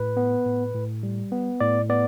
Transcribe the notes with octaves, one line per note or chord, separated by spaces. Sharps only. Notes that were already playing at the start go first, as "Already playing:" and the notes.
Already playing: A2 B4
B3
A2
A2
G3
B3
A2 D5
B3 D5